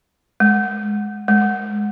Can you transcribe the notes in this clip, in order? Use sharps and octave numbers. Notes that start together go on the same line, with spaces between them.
G#3
G#3